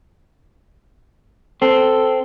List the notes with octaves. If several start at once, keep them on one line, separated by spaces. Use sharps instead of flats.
C4 A4